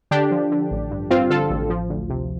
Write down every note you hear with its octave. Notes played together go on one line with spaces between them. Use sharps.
D3 D4 G4
F3
D3
A1
G2
G2 C4 F4
D3 F4 A4
A1
F3
D2
C3